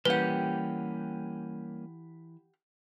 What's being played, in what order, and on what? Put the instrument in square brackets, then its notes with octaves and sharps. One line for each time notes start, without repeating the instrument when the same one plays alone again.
[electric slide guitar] E3 [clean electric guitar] G3 A#3 C#4 [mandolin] G4 F#5 [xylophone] B4